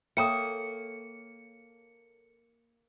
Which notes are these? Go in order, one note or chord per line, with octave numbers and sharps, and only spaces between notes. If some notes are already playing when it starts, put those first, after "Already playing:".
A#3 A4 C#5 E5 G5 A#5 D#6 C#7